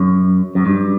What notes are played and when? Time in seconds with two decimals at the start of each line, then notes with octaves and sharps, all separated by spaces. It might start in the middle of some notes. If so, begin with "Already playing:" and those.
Already playing: F#2
0.55 F#2
0.66 G2